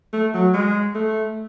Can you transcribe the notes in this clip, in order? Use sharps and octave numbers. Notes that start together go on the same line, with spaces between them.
A3
F#3
G#3
A3